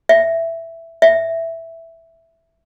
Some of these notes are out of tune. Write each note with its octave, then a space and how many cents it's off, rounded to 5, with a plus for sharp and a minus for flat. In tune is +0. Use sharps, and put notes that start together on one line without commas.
E5 +5
E5 +0